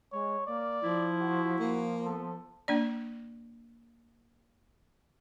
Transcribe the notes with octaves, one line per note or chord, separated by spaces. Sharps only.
G#3 C#5
A#3 D5
F3 E4
F#4
F3 A#3
B3 A4
A#3 D4 D5